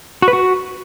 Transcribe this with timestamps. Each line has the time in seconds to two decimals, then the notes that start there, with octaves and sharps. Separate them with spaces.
0.22 F#4
0.28 B4
0.33 F#4